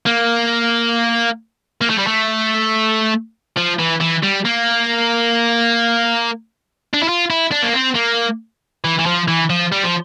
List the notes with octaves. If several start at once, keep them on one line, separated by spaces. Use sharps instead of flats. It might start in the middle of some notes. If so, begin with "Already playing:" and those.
A#3
A#3
A3
G3
A3
F3
E3
E3
G3
A#3
D4
E4
F4
E4
D4
A#3
C4
A#3
E3
E3
F3
E3
F3
G3
F3